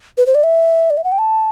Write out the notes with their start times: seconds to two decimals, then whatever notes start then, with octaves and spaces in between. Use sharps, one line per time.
0.18 B4
0.26 C5
0.35 D5
0.43 E5
0.90 D5
0.97 E5
1.04 F#5
1.12 G5
1.19 A5